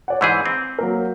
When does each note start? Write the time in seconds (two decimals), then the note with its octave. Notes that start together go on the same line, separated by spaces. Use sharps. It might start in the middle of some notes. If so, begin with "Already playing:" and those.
0.08 C#5 D5 F#5
0.21 G#2 E3 G#4 E6 G6 B6
0.46 C4
0.79 F#3 A#3 A#4